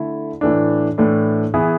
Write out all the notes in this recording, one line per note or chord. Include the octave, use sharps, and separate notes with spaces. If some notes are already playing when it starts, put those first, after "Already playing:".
Already playing: D3 A3 E4 A4
A2 E3 A3 D4
A2 E3 A3 D4
E3 B3 E4 G#4